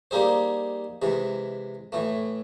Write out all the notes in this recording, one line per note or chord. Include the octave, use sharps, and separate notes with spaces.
G3 A#3 D#4 G#4 C5
C3 E3 G#3
A2 E3 A3